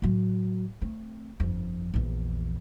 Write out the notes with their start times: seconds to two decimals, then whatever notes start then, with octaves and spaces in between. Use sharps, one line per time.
0.02 A2 F#3
0.81 A3 C4
1.40 G1 F2
1.94 A#1 E2